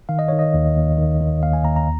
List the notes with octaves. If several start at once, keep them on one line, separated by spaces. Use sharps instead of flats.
D#3 F5
D#5
D#3 C#5
D#5
D#2
D#2
D#3
D#3
D#2 F5
G#5
D#2 A#5
A#5